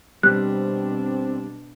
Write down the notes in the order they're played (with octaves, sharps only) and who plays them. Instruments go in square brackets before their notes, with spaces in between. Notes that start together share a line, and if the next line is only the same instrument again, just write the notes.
[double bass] B2 D4 [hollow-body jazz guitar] G3 [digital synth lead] C4 [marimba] F#6